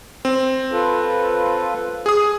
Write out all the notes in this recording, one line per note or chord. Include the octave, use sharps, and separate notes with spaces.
C4
F4 A4 B4
G#4 D#6